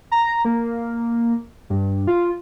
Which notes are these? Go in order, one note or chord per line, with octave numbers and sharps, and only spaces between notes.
A#5
A#3
G2
F4